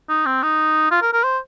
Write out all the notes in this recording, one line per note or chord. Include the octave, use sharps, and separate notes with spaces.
D#4
C4
D#4
F4
A#4
A#4
C5